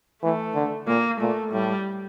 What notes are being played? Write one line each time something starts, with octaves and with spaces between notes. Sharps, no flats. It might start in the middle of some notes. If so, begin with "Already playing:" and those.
E3 A3
D3
A#2 A#3
A#2 A3
A2 G3